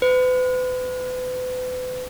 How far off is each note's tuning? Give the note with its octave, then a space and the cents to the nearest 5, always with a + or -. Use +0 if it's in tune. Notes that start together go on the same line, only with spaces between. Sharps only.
B4 +40